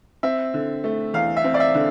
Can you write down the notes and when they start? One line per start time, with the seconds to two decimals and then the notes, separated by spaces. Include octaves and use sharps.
0.23 C4 E5
0.54 D3
0.84 A3
1.14 E2 F5
1.37 E5
1.44 C4
1.54 D5
1.60 E5
1.75 D3